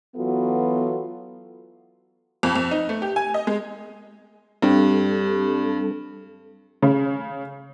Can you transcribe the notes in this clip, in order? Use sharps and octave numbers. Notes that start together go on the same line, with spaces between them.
E3 F#3 B3 F4 F#4 A4
F2
F2
D#4
A3
G4
G#5
D#5
G#3
G2 G3 C4 D4 G4 A4
C#3